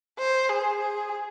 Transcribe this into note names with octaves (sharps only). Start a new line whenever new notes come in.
C5
G#4
G#4